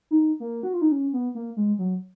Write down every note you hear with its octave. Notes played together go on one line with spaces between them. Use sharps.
D#4
A#3
F#4
F4
D#4
C#4
B3
A#3
G#3
F#3